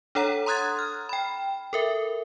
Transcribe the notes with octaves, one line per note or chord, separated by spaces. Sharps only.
D4 A4 C#5 F#5 A#5
A#5 C6 D#6 F#6 G#6 A6
F6
G5 B5
A4 A#4 E5